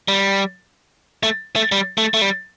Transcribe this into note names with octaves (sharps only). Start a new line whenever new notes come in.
G3
A3
A3
G3
A3
A3
G3